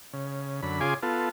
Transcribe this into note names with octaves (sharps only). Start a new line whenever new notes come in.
C#3
F#2 D3 B5
C#3 F4 G#4 G#5 C6 D6
B3 F4 A4